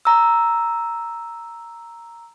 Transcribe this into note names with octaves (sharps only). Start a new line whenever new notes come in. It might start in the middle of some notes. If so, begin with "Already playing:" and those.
A#5 E6